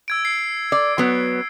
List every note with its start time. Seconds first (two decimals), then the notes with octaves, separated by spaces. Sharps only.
0.08 E6 G#6 D7
0.25 C7
0.72 D5
0.98 F#3 B3